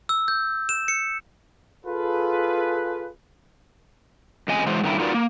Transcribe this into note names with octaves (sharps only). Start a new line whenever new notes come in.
E6
G6
E7
C#7
F4 G#4 A4 B4
F2 C#3 D#5 G#5
E3 F#3 G#3 C5
G2 D3 D#3 F#3 D#4 E4
D#4 F4 F#4 A#4 B4 D5
A#3